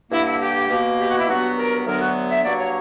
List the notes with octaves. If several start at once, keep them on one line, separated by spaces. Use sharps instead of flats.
G2 D3 A#3 E4
E4
G4
B2 A#3
G4
F#4
E4
G2 F#3 B3 F#4
A#4
D2 D3 F#3 B3 A#4
F#4
E5
G2 F#3 A#3 D5
C#5